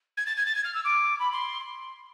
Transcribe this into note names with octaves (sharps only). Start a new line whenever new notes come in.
G#6
A6
G#6
A6
G#6
F6
E6
D6
B5
C6